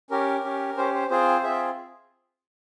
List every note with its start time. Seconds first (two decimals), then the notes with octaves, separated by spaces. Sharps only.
0.10 C#4 G4 A#4
0.44 C#4 G4
0.77 C#4 G4 C5
0.94 C5
1.10 C4 F4 G#4 C5
1.43 C4 F4 G#4 E5